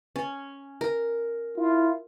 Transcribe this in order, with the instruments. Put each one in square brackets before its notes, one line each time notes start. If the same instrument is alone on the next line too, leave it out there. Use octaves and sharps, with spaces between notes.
[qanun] C#4
A#4
[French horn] E4 [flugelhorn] F4